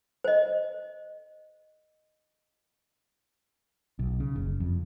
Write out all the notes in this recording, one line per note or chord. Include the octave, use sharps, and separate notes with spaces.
C5 D#5
B1
C#3
F#1
F2